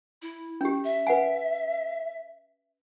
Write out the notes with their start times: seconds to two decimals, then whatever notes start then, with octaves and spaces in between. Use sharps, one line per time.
0.22 E4
0.61 C#4 G4
0.84 E5
1.07 B4 F#5 G#5